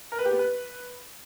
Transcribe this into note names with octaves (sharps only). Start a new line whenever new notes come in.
A#4
B4
G4
B3
B4